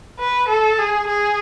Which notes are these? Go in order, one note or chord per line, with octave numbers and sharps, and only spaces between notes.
B4
A4
G#4
G#4